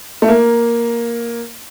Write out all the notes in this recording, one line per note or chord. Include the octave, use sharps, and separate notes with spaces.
A3
A#3